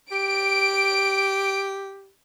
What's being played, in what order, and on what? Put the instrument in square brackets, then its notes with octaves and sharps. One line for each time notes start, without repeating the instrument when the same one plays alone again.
[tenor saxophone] G4 [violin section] D7